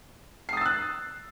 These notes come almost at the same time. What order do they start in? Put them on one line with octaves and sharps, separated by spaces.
C7 D#6 A6 E6 F#6